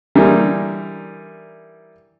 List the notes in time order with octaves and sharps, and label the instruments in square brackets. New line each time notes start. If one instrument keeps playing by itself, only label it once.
[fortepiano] D3 E3 G3 D#4 A#4